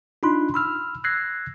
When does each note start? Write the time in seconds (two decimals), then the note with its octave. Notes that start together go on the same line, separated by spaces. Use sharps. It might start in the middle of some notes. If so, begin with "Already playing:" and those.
0.23 D4 D#4 F4 B5 C6 F#6
0.54 B5 E6 F6
1.04 E6 F#6 G#6 A#6 C7